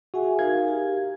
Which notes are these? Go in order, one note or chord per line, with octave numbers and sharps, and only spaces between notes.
F#4 G#4 E5 G#5
D#4 A#4 F5 G#6
G4